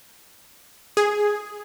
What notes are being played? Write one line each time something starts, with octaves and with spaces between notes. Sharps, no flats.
G#4